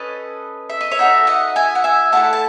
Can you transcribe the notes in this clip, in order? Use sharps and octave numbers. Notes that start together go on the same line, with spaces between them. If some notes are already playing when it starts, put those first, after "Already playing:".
Already playing: C#4 A4 B4 D#5
E5
D#5
C#5 E5
D#4 F#4 A4
D#5 F#5
E5 G#5
F#5
E5 G#5
A3 E4 A4 F#5 A5
A5